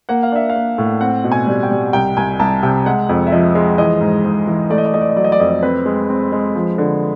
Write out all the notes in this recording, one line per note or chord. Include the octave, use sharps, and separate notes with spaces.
A#3 F#5
F5
D4 E5
F5
A#3
A2
C4 F#5
B2
G#5
G3
G5
G3
C2 G5
C2 G#5
C2 A5
C3 G5
G#3 F#5
F2
E5
F3 D#5
G#3
E3 D#5
G#2
G#2
E3
A3 D5
D#5
D5
A3 D#5
D5
D#5
F#3 D5
D#5
D5
F2 D#5
D5
C4 B4
G#3
C4
G#3
F3
D3